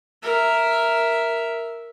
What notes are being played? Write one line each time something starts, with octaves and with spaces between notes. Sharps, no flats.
A#4 E5